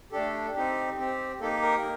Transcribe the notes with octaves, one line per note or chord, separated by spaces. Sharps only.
A3 D4 G4 A4
C4 D#4 G4
C4 G4
A#3 D#4 G4 A4
A#4